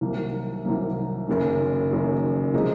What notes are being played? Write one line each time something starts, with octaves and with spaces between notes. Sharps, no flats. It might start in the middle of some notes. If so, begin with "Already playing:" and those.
C2 C3 D#3 F#3 A#3
C2 C3 D#3 F#3 A#3
F#1 F#2 D#3
F#1 F#2 D#3
C3 F3 G#3 D#4